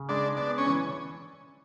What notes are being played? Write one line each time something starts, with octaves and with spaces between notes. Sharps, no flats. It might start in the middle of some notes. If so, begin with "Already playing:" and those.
Already playing: C#3
G#3 D4
B3 D4
C#4
E3